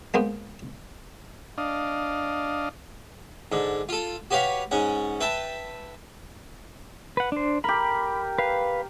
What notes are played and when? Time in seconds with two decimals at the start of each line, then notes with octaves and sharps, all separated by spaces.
0.14 G#3 A#3 B3 C5
1.58 D4 D#5 F5
3.52 G#2 D3
3.89 F4 A4
4.31 F#4 G4 B4 C#5 F5
4.71 G#2 C#4 F#5
5.21 B4 E5 G5 A5
7.17 B4 F#5
7.32 D4 C5
7.64 G4 A#4 B5
8.38 B4 F5